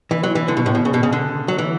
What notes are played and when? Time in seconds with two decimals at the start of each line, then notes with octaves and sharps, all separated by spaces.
0.11 E3
0.23 F#3
0.35 E3
0.48 D3
0.57 B2
0.66 A2
0.75 B2
0.85 C#3
0.94 B2
1.03 C#3
1.12 D3
1.48 F#3
1.58 E3